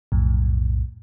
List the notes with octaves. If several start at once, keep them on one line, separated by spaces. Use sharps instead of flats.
B1 F2 A2